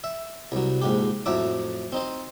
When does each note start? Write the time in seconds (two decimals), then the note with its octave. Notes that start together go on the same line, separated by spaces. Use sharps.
0.04 E5
0.52 C2 F#3
0.82 A#1 G#2 G4
1.26 F2 A2 F#3 E5 D6
1.92 C4 D#4 C5